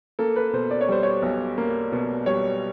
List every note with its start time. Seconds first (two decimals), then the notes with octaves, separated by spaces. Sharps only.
0.19 A#3 A4
0.36 B4
0.53 B2 C5
0.71 D5
0.81 C#5
0.89 G3 C5
1.03 C#5
1.22 B1
1.58 A#3
1.92 B2
2.26 G3 C#5